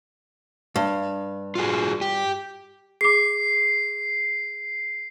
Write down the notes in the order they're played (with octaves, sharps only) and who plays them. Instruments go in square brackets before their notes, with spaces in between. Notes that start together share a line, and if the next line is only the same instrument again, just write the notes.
[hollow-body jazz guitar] G2
[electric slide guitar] F4 F#4 G#4
G4
[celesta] G#4 D6 [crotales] C7